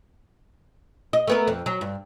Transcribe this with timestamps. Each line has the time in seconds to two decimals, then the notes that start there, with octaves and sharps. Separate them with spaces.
1.13 D#5
1.28 A3 B3 A#4
1.48 F2
1.66 F#3
1.81 G2